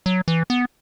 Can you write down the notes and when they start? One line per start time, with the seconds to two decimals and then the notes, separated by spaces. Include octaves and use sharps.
0.06 F#3
0.28 E3
0.50 B3